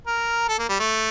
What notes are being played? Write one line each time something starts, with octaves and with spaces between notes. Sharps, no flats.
A#4
A4
A#3
G3
A3